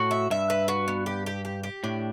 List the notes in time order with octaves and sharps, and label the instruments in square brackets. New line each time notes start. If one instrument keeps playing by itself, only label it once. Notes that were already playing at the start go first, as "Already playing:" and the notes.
Already playing: [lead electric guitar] A2 [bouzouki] F#4
[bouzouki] E5
[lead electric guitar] G2 [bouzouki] E5
[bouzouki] B4
F#4
B3
G4
G4
G4
G4
[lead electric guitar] A2 [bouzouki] D4